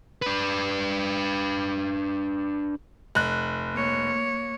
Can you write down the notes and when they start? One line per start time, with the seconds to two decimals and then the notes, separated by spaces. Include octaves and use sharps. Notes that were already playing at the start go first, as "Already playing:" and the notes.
0.22 D4 B4
3.15 F1 F#6
3.73 A#3 C#5